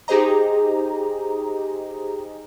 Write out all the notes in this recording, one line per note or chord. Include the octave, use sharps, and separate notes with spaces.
D#4 G4 G#4 C5 D#5 A#5